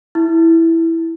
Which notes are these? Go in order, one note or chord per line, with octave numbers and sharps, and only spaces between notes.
E4